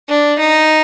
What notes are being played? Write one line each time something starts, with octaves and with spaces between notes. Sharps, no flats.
D4
D#4